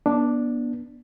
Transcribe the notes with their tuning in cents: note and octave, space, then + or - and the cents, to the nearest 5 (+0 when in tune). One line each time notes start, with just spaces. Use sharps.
B3 -35 D4 +0